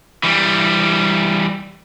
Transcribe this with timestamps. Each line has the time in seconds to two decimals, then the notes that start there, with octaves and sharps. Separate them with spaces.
0.23 E3 G3